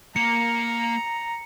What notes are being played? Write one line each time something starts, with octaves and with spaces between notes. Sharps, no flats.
A#3 A#5 C#7